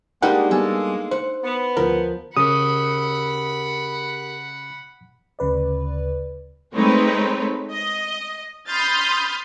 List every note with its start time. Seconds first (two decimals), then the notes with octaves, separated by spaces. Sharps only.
0.22 G3 G#3 A#3 D4 D#4 A#4 F#5 G5
0.51 G3 B3 A4 G#5
1.11 C5 F#5
1.44 B3
1.77 D2 F3 A#4
2.37 C#3 G4 A#4 F#5 B5 D#6
5.39 D2 C#3 B4 D5
6.75 G#3 A3 C4 D#4 B4 C#5
7.73 D#5
8.69 B5 C6 D#6 F6 G6 A6